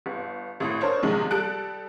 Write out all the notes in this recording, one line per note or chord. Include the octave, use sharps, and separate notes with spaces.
G1
G#1 A2 D#6
D4 A#4 C5 C#5
A#1 G#2 C3 D#3 G#3
G3 A4 F#6 D7